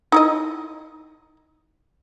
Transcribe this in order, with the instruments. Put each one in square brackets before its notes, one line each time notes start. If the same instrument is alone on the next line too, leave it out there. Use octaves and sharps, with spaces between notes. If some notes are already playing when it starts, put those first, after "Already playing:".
[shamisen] D#4 E4 D#5